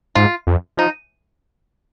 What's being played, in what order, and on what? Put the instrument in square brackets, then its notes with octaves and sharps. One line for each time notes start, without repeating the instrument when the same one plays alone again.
[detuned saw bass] G#2 [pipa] F4
[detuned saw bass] F2
[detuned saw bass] F3 [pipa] D#4